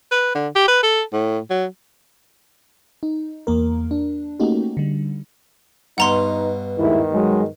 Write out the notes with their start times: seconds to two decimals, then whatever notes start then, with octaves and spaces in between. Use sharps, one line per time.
0.11 B4
0.35 D3
0.56 G4
0.68 B4
0.83 A4
1.13 A2
1.50 F#3
3.03 D#4
3.47 E2 A#3 A#4
3.91 D4
4.40 A3 A#3 C#4 D#4 F#4 G4
4.77 D3 G3
5.98 G2 B2 D#4 F#5 A#5 C6
6.79 D#2 G#2 D#3 E4
7.13 F#3 G#3